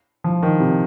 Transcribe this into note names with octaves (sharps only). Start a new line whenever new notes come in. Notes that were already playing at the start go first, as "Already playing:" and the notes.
F3
D#3
C3